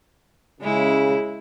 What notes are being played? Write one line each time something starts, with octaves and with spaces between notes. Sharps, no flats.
C#3 G#3 E4